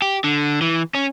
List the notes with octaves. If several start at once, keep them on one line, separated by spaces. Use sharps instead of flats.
G4
D3
E3
C#4